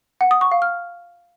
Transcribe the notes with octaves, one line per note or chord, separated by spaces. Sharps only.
F#5
D#6
C#6
F5
F6